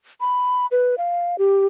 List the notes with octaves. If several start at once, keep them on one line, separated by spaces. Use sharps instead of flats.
B5
B4
F5
G4